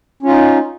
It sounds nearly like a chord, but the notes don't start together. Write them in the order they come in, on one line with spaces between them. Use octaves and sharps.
C#4 F4 D#4